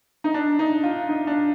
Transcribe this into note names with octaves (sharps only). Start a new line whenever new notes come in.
D#4
D4
D#4
F4
D#4
D4